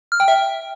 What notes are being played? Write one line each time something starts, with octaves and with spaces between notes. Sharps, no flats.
F6
G5
E5